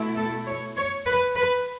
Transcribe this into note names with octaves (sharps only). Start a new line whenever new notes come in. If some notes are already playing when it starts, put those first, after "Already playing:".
Already playing: B2 A3 E4
A4
C#5
C#5
B4
B4